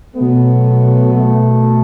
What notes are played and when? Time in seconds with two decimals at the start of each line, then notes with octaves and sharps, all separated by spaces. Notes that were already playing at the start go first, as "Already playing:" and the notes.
0.15 B2 F#3 A3 B3
1.10 B2 A3